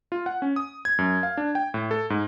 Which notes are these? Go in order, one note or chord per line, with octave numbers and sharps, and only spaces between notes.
F4
F#5
C#4
D#6
G#6
F#2
F5
D4
G5
A2
A4
G#2